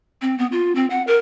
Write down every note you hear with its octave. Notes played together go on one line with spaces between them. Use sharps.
C4
B3
F4
C4
F#5
A#4